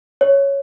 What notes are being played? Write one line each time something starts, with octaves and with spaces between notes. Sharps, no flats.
C#5